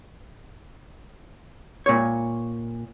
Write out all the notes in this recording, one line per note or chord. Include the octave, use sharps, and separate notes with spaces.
A#2 C#5